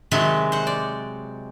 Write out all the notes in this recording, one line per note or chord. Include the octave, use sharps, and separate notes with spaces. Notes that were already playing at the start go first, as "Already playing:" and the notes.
C3 D#3 F#3 G#3 E5 A5
C5 F#5
D5